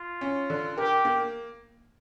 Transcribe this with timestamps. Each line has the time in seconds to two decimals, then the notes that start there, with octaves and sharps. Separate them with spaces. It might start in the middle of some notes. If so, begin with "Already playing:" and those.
Already playing: F4
0.21 C#4
0.50 D3
0.77 G4 A#4
1.05 A#3